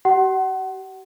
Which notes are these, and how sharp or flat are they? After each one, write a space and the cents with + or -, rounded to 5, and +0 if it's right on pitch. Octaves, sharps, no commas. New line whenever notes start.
G4 -45 F#5 +30